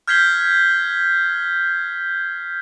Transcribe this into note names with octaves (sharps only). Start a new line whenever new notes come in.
F6 G6 G#6 B6 C7 G7